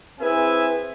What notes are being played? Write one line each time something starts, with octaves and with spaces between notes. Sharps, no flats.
C4 E4 G#4 B4 E5 G#5